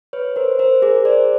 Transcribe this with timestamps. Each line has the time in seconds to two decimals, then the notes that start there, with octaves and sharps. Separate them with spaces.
0.13 B4 C#5
0.36 A#4 C5
0.59 A#4 C5
0.82 G#4 A#4
1.05 C5 D5